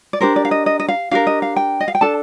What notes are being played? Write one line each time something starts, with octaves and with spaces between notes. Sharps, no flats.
D5
D4 G4 A#4 C5
D5
F5
D#5
D#5
D#5
F5
D4 G4 A#4 F5
D#5
F5
G5
D#5
F5
G5
D4 A4 A5